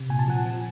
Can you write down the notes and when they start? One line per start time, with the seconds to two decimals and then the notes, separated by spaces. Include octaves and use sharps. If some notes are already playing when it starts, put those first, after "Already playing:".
Already playing: C3
0.09 A#2 G#5
0.19 A5
0.28 F3 F#5 G#5
0.46 F3